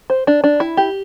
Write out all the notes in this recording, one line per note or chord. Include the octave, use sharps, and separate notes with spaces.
C5
D4
D4
E4
G4